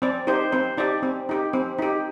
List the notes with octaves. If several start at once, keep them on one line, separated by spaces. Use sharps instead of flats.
C4 D5
D#4 G4 C5
C4 C5
D#4 G4 D5
C4
D#4 G4
C4
D#4 G4